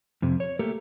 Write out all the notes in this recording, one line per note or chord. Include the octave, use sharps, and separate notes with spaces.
F2 C3
C#5
A3 A#3 G4 A4 A#4